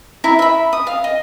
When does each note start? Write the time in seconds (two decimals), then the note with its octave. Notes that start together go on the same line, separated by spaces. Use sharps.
0.24 E4 E5 A#5
0.39 E5 B5
0.73 D#6
0.87 F5
1.04 D#5